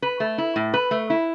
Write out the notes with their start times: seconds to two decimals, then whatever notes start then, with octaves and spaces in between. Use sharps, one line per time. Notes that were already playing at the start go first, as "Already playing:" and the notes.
0.02 B4
0.20 A3
0.38 E4
0.56 A2
0.74 B4
0.91 A3
1.10 E4